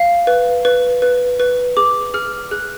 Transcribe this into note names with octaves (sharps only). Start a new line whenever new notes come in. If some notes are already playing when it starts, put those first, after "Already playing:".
Already playing: F5
B4
B4
B4
B4
G#4 D6
G#4 F6
G#4 F#6